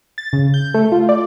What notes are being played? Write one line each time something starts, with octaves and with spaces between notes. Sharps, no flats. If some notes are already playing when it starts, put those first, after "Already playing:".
A6
C#3
G6
A3
F4
D5